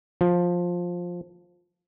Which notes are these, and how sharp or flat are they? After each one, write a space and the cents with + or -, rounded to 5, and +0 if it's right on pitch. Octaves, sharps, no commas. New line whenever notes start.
F3 +10